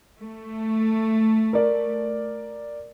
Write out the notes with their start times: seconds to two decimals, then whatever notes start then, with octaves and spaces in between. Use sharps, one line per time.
0.21 A3
1.53 A#4 D5